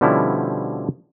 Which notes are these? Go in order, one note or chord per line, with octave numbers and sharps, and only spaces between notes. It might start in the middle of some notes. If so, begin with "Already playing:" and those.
B2 D3 F3 G3 C#4 E4